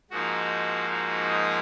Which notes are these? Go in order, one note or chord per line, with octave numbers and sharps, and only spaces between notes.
G#2 F3 A#3 D#4 F#4
F#4
D#5